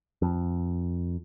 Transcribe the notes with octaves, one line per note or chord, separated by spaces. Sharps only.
F2